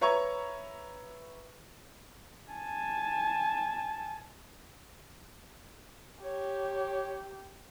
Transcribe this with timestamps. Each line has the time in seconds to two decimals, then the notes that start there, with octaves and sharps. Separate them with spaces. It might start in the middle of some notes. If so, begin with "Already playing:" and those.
0.01 B4 C#5 E5 A#5 C#6 G#6
2.51 G#5 A5
6.24 G4 C#5